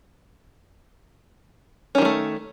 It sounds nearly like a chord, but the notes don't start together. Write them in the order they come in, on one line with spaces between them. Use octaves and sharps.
C#4 D#3 G3 A3